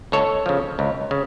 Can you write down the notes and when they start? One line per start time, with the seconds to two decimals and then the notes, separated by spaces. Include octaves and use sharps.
0.12 C#2 A4 C#5
0.46 C#3 F3
0.79 C#2
1.11 C#3